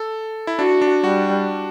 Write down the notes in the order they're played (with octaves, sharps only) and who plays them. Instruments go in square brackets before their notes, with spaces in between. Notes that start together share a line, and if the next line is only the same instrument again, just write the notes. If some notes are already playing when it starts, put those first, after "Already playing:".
Already playing: [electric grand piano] A4
E4
[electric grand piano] D4 [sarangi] F#4
[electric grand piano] D4
[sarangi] G3 [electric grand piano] F#4